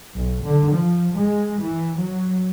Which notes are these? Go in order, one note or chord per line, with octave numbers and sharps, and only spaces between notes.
B1
D3
F3
G#3
E3
F#3